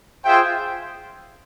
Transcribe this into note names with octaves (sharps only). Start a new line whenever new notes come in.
F4 G#4 C5 E5 G5